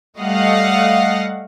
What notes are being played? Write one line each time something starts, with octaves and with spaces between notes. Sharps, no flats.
G3 A3 D#5 F5 F#5